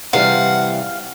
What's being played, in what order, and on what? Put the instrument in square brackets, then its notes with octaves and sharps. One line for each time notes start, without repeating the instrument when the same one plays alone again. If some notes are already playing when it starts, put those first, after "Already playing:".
[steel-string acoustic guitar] C3 E3 G3 [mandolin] F5 [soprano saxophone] F#5